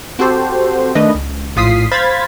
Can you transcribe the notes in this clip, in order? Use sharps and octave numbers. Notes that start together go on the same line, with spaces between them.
C4 F#4 G4 A4 C5
D#3 A3 D4 B4 D#5
C#2
A#1 A2 F4 D#6 B6 C7
C5 F5 B5 G#6 A6 B6